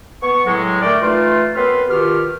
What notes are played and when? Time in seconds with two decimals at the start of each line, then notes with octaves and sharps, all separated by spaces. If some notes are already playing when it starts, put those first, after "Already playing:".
0.22 B3 C#6
0.46 A2 F#3 G#3
0.81 D3 A3 A#4 D5 G5 F6
1.02 E3 A3 D#4 F4
1.55 F#2 B3 C4 B4 C6 F6
1.89 B2 D#3 F4 G4 F6